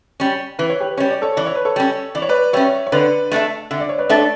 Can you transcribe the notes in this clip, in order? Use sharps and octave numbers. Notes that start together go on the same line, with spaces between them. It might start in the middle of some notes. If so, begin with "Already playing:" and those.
G3 C#4
E3 B4
C#5
G4 B4
G3 C#4 C#5
D5
A4 C#5
E3 D5
C#5
B4
A4 C#5
G3 C#4
E3 D5
C#5
B4 D5
G3 C#4 C#5 E5
C#5
D3 B4 D5
A3 D4 A4 E5
D3 E5
D5
C#5
B4 D5
A3 D4 A4 C#5 E5
D5